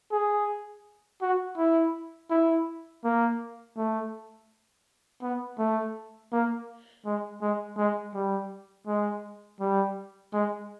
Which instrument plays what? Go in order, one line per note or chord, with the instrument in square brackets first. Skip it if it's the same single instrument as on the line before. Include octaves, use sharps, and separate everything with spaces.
[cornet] G#4
F#4
E4
E4
A#3
A3
B3
A3
A#3
G#3
G#3
G#3
G3
G#3
G3
G#3